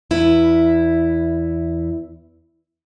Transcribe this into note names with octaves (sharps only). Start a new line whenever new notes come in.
E2 E4 B4